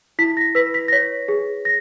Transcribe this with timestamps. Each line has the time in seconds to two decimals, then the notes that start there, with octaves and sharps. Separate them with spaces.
0.19 E4 B6
0.37 A#6
0.55 B4 B6
0.74 B6
0.88 A#6
0.92 C#5 B6
1.28 G#4
1.65 A#6